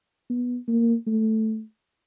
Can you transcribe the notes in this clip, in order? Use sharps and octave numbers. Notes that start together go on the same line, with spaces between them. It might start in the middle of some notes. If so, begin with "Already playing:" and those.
B3
A#3
A3